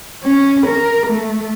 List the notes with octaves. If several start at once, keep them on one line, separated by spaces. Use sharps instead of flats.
C#4
A#4
A3